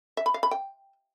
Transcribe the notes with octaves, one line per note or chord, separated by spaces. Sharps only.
E5
B5
F5
B5
G5